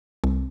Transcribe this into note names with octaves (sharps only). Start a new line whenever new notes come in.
C2